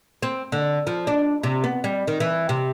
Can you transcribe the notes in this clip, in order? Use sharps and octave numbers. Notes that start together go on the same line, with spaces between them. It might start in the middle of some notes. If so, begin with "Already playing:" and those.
C4
D3
F3
D4
C3
B3
G3
D#3
E3
C3